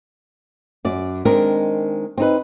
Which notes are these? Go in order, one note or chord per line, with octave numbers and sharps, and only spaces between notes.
F#2 D5
D#3 G#3 C4 D4 A#4
C4 D#4 B4